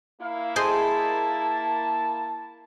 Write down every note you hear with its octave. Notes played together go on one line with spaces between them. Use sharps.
A#3 E4 F5
G#4 C5 D#5 A5